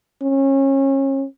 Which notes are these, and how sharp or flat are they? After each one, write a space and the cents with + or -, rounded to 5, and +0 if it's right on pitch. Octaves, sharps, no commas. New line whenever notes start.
C#4 -30